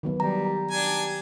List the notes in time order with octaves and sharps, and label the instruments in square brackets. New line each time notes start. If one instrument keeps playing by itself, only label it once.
[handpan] D#3 F#3 B3
[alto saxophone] G3 [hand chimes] A#5
[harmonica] D4 G#5 [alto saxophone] G4